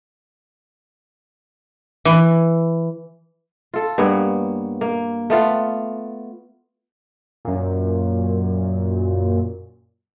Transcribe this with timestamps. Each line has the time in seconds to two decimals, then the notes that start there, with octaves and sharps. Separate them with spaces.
2.05 E3
3.74 F4 A4
3.98 G2 A#3 B3 C#5
4.81 A#3
5.30 A3 B3 F4
7.45 F#2 A#2